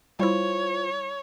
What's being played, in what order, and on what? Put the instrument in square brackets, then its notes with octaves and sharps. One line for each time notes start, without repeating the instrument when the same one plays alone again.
[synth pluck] G3 E4 [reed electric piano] F4 C5 [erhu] C#5